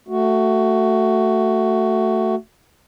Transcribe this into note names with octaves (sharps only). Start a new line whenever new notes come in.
A3 F#4